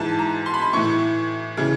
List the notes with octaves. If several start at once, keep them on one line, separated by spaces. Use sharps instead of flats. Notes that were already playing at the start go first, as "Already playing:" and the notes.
Already playing: G#2 E3 A5
A#5
C6
B5
C6
A2 E3 C#6
C#3 E3